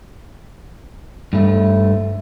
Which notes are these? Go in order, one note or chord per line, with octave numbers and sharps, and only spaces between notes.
G2 A3